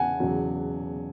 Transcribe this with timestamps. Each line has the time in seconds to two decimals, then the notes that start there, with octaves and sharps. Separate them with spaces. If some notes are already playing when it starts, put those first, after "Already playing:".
Already playing: E2 C#3 F#5 G#5 A5
0.20 E2 C#3 F#3